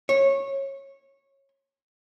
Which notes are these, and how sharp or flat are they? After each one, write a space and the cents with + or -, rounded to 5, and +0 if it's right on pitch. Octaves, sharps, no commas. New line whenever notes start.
C#5 -20